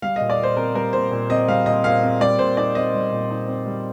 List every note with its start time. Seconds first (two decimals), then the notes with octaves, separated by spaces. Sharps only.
0.02 G3 F5
0.16 A#2 D#5
0.30 D5
0.38 A#2
0.43 C5
0.57 C4 A#4
0.75 G3 A#4
0.93 A#2 C5
1.11 A#2
1.30 C4 D#5
1.48 G3 F5
1.66 A#2 D#5
1.84 A#2 F5
2.03 C4
2.21 G3 D5
2.39 A#2 C5
2.57 D#4 D5
2.75 C4 D#5
2.94 G3
3.12 A#2
3.30 D#4
3.48 C4
3.66 G3